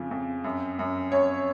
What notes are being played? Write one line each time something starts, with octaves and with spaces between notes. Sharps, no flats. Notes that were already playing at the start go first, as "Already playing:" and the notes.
Already playing: F2 C#3 F3
F2
F#2
F#2
F#2 C#5